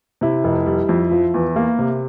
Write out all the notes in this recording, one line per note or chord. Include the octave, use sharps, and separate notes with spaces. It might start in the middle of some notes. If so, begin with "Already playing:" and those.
C3 E4
F1
G3
F2
F3
E2
A#3
C3